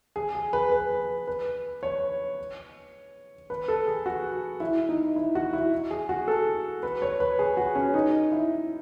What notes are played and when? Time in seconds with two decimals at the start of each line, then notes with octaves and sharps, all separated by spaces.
0.16 G#4
0.35 G#4
0.53 B4
0.72 B4
1.28 B4
1.83 C#5
3.50 B4
3.68 A4
3.87 G#4
4.06 F#4
4.60 E4
4.89 D#4
5.16 E4
5.35 F#4
5.53 E4
5.91 G#4
6.09 F#4
6.28 A4
6.83 B4
7.02 C#5
7.20 B4
7.39 G#4
7.57 F#4
7.75 C#4
7.94 D#4
8.32 E4